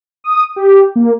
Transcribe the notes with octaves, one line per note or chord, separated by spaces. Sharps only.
D#6
G4
A#3